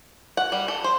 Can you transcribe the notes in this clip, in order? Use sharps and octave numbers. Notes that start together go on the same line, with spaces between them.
F#5
G3
A4
C5